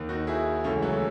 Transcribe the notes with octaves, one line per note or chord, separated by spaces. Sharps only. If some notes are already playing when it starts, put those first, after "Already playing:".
Already playing: D#2 D#3
D#4 F#4
E4 G#4
C#2 C#3 E3 A3 C#4
F#3 A3